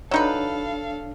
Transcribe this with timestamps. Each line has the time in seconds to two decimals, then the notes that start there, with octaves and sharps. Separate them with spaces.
0.11 F#3 D4 D#4 A4 B4 C#5 F5